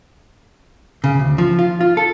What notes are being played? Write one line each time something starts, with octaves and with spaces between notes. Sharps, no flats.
C#3
D2
F3
F4
F4
A4